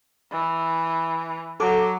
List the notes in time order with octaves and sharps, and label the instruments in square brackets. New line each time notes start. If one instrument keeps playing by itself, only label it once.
[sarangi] E3
[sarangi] F#3 [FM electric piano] A4 D6